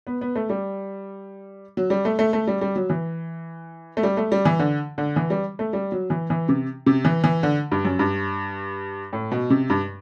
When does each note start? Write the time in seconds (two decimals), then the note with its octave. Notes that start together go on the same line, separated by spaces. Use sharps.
0.07 B3
0.21 B3
0.36 A3
0.50 G3
1.77 F#3
1.90 G3
2.05 A3
2.19 A3
2.33 A3
2.47 G3
2.61 G3
2.76 F#3
2.90 E3
3.97 A3
4.03 G3
4.17 A3
4.32 G3
4.45 E3
4.59 D3
4.98 D3
5.16 E3
5.30 G3
5.59 A3
5.73 G3
5.92 F#3
6.10 E3
6.30 E3
6.49 C3
6.86 C3
7.05 E3
7.24 E3
7.43 D3
7.72 G2
7.85 F#2
7.99 G2
9.13 A2
9.32 B2
9.50 C3
9.70 G2